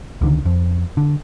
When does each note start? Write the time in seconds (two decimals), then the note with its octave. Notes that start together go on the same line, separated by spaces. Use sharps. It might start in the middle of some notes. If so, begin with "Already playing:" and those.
0.21 C#2 D3 D#3
0.45 F2
0.97 D3